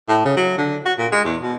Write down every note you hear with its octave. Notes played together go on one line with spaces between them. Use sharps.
A2
C#3
F#3
D3
F#4
A#2
G#3
E2
B2